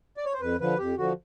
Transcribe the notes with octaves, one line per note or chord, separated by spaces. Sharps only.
D5
C#5
C5
F2 B4
D3 F3 B4
F2 G4
D3 F3 F#4